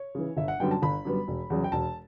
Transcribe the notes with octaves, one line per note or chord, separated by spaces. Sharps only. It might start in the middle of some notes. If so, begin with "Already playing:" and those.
Already playing: C#5
C#3 E3
G1 E5
F#5
F#2 D3 G3 B3 G5
A5
G1 B5
F#2 D3 G3 B3
E1
E2 C#3 F#3
G5
E1 A5